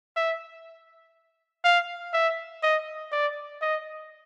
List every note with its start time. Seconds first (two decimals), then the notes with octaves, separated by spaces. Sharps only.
0.17 E5
1.64 F5
2.14 E5
2.63 D#5
3.12 D5
3.62 D#5